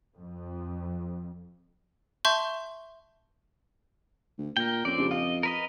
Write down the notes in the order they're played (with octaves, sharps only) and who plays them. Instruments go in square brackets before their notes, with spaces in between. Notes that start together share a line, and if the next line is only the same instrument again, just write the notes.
[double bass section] F2
[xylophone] E5 A5 C6 C#6 G6
[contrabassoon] D2
[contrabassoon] A#2 [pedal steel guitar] A#4 G5
[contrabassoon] F2 [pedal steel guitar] C4 D5 [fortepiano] C#4
[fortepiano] C#3 G3 D4
[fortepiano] F4 [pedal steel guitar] D#5
[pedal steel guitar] A#4 B4 D#5